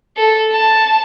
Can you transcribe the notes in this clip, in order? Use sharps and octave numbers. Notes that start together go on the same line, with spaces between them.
A4
A5